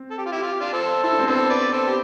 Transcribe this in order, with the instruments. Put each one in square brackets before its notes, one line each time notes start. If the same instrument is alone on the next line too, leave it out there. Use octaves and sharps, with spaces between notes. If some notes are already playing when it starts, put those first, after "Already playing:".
Already playing: [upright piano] C4
[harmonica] A4
G4
F4
E4 G4
F4
G4
D4 F4
A4 C5
[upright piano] E4 [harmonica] A4 C5
[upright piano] D4
C4
[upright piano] B3 D4 [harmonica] A4 C5
[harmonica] B4 D5
A4 C5
G4